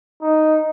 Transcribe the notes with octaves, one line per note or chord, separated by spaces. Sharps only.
D#4